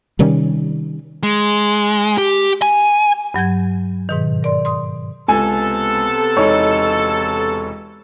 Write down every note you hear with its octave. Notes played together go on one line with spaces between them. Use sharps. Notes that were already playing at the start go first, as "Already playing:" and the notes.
C3 D#3 G3 C#4
G#3
G4
G#5
G2 F#3 G6 G#6
G#2 B2 D#3
A#4 D5 C6
C6 D#6
C#2 C3 B3 A4 G#5
E1 D#4 C#5